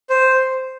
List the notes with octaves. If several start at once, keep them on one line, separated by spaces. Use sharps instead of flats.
C5